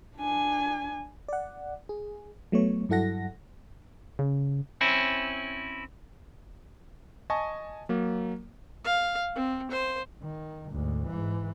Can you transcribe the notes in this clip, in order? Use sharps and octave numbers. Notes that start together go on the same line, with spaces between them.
D4 G#5
D5 F#5
G#4
F#3 A3 B3 C#5
G2 F#3 E4 A4 F#5 A#6
C#3
C4 C#4 E4
D#5 G#5 A5 C#6
F#3 A#3
F5
C4
C5
D#3
D2 G#2
G#2 E3